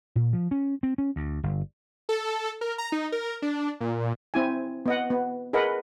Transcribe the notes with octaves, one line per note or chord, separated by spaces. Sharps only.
A#2
F3
C#4
C4
C#4
D2
G1
A4
A#4
A#5
D#4
A#4
D4
A#2
C4 E4 G#5
B3 D#5 F#5
B3
G#4 A#4 B4 D#5 F#5